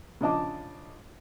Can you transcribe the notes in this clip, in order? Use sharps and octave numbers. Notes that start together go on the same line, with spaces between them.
C#3 F3 D4 D#5 A5 D6